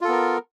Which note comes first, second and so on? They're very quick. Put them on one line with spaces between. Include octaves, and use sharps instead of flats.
F4 A4 B3 A#4